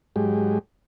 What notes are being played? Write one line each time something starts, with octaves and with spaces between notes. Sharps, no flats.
G#2 F#3 G#3 G4